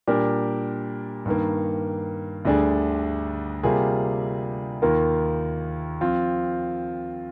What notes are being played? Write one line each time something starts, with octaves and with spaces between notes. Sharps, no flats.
A#2 G3 D4 G4 A#4
G2 D#3 A#3
D2 D3 G3 D4 G#4
C3 G3 A#3 F4 G#4
D#2 D#3 A#3 F4 A#4
F3 C4 F4